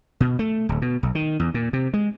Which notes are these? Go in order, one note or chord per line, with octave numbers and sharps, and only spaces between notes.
B2
A3
D1
B2
B1
D#3
E2
A#2
C3
G#3